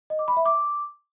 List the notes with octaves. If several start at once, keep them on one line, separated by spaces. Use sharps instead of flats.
D#5
D6
B5
E5
D6